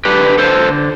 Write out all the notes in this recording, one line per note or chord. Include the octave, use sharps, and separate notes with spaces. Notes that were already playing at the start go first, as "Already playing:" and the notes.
D3 G4 B4
D3 A4 C5